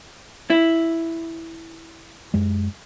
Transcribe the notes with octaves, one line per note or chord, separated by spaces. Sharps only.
E4
F#2 G#3